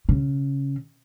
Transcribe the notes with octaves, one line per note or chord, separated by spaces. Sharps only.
C#3